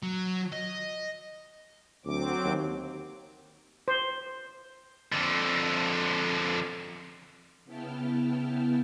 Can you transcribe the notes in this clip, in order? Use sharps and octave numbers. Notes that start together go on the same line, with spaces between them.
F#3
D#5
D2 F#3 C4 D6
D#2
C5
F2 D3
C#3 B3 E4 G5 A5 F6